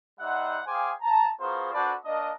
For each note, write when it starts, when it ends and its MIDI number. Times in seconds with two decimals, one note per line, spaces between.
0.20 0.60 55
0.20 0.60 63
0.20 0.60 72
0.20 0.60 76
0.20 0.60 78
0.65 0.91 68
0.65 0.91 72
0.65 0.91 77
0.65 0.91 79
0.65 0.91 80
0.65 0.91 86
1.01 1.26 81
1.01 1.26 82
1.39 1.69 59
1.39 1.69 65
1.39 1.69 66
1.39 1.69 68
1.39 1.69 70
1.39 1.69 72
1.72 1.93 62
1.72 1.93 66
1.72 1.93 69
1.72 1.93 71
1.72 1.93 72
1.72 1.93 74
2.05 2.30 58
2.05 2.30 62
2.05 2.30 70
2.05 2.30 75